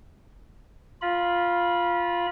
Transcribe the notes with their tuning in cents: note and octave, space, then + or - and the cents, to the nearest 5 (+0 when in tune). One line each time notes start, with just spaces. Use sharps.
F4 +0 B5 -25